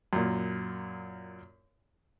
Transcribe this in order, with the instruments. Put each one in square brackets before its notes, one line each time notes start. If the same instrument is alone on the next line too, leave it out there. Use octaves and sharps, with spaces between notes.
[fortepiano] F#2 A#2